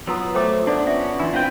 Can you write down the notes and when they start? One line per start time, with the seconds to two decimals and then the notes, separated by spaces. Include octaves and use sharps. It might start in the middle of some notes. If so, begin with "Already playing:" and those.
0.07 F#3 B3 F4 A#5 D#6 E6
0.35 A3 C5 G5 D6
0.67 B3 D4 F4 D5 D6
0.87 C#4 E5 C#6
1.20 E3 D4 E4 F4 B5
1.33 C4 B4 F5 G5